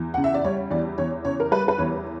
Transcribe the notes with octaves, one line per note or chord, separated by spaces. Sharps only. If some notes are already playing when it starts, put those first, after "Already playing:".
Already playing: E2
C#3 F#5
E5
D5
G3 C#5
E2 D5
E2 C#5
C#3 C#5
A#4
G3 B4
B4
E2 C#5